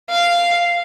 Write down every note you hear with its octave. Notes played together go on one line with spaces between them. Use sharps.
F5